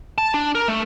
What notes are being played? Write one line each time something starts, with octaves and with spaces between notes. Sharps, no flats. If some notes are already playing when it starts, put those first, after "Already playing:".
A5
D4
A#4
A3